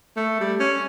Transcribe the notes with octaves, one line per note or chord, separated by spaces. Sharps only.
A3
G3
C#4